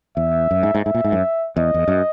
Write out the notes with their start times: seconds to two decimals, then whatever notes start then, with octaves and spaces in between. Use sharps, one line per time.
0.16 E2 E5
0.51 F#2
0.63 G#2
0.75 G#2
0.86 G#2 E5
0.94 A#2
1.04 G#2
1.12 F#2
1.56 E2 D#5
1.74 E2
1.88 F#2